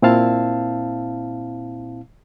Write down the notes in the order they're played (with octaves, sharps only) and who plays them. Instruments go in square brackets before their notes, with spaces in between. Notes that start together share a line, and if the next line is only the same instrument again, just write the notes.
[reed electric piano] A#2 C4 E4 F5 A5